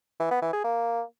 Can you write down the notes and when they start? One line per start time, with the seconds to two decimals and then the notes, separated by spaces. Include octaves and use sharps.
0.20 E3
0.31 B3
0.42 E3
0.53 G#4
0.64 A#3